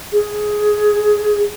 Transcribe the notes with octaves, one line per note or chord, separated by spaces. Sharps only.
G#4